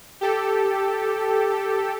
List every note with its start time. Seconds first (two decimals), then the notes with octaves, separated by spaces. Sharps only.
0.21 G4 A4